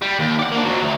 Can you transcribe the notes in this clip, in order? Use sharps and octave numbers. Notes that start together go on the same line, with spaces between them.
G3
D#2
D5 F#5
A#3 D4
F2 F#3
D2